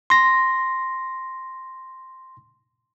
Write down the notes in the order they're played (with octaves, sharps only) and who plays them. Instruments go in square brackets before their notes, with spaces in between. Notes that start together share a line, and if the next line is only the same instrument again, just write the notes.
[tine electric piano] C6 A#6